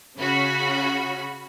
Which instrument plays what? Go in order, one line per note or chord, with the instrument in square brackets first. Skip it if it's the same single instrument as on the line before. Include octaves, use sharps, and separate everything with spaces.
[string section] C#3 C#4 F#4 B5